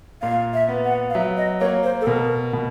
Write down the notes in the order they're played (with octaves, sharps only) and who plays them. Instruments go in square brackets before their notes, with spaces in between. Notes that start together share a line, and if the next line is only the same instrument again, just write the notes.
[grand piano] A#2 [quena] F5
[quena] E5
[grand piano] B3
[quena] F#5
F5
[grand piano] F#3 [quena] E5
[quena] D#5
[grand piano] A#3 [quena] C#5
[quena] C5
A4
[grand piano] B2 [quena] A#4
[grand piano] B2